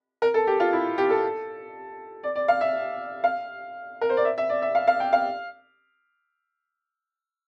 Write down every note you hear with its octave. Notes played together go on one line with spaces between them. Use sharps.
A#4
A4
G4
F4
E4
G4
A4
D5
D5
F5
E5
F5
A#4
C5
D5
E5
E5
D5
E5
F5
F5
G5
F5